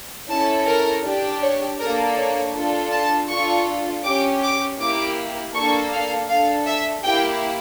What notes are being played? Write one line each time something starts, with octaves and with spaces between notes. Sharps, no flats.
C#4 E4 A4 A5
A#4
D4 G4
C#5
A#3 D4 A4 A#4
C#5
D4 F4 A4
A5
D4 F4 A4 C#6
C#4 G4 D6
D6
A#3 E4 G4 D6
A#3 D4 A4 C#6
F5
D4 A4 F5
E5
A#3 E4 G4 G5